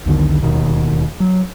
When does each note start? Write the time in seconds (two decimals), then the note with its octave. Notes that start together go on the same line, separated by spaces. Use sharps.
0.06 B1 E2 D3 D#3
0.43 D1 D#2 B2 D#3
1.20 F#3